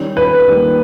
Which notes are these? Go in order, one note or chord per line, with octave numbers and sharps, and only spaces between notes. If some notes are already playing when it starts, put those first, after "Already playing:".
Already playing: D#3 G3 C#4
B4
D#2 D#3 G3 A#3